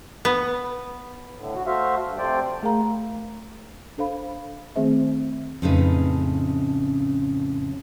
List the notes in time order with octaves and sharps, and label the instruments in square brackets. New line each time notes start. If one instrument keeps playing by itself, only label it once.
[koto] B3
[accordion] A2 D3
F#4
A3 F#4 C5 E5 F5
G2
C3 F3 A3 C5 D5 G5
[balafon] A3 G#4 A#4 F5 A#5 B5
D4 A4 C5 F5 B5
D#3 A3 C4 G#4 C5 E5
[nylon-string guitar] F2 A2 C#3 C#4 D#4 B4